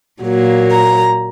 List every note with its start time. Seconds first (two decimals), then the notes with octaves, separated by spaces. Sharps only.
0.22 A#2 F#3 A#3
0.72 A#5